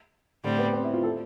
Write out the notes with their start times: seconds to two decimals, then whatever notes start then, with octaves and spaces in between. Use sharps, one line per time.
0.44 A2 D3 G3 C4
0.59 B3
0.73 C4
0.84 E4
0.94 F4
1.03 A4